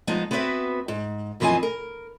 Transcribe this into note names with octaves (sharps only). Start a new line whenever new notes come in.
F3 G#3 B3 D#4
B3 C4 F#4 B4 C#5 E5
G#2
F#2 E3 F3 C4 D#5 G#5
A#4